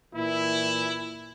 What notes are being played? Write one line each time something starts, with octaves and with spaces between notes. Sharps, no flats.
A#2 E3 E4